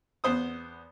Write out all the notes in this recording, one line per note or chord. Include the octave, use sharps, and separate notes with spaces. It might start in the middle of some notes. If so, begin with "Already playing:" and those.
E2 B3 C5 D#6